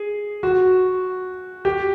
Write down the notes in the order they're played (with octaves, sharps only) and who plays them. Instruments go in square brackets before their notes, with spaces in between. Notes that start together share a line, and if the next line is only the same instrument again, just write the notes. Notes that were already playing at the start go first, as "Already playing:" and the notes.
Already playing: [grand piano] G#4
F#4
G4